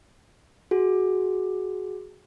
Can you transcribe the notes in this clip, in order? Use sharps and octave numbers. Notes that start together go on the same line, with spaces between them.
F#4 G#4